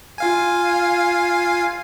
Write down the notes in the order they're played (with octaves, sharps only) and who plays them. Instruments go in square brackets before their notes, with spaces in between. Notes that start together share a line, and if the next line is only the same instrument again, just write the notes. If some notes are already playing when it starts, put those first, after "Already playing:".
[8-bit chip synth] F4 F5 G#5